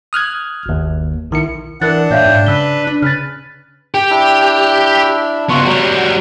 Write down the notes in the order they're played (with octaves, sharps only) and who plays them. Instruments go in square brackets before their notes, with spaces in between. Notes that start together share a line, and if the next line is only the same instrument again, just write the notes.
[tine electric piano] D#6 F6 F#6 G#6
G1 D#2
B1 D#3 E4 C#7
[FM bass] E3 [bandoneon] D4 [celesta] A#4 F#6 A6 [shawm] F#5
[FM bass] A#2 [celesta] C#5 E5 F5 [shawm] G5
[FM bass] G#2
[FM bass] C#3 [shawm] B4 [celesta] E6 G7
[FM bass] D4
[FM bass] C#3 [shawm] B4 [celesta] F6 A6
[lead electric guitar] G4 [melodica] G5
[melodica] D4 E4
[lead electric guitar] C#3 B3 [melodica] F4 F#4
[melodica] F#3 [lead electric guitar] G3 F#4